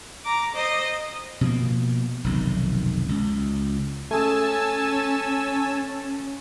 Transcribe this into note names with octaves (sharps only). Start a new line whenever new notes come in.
A#5 D6
C5 D#5
B2 F3 A#3
F1 B1 D#3
C#2
A3 C#4 G#4 G#5 A5 E6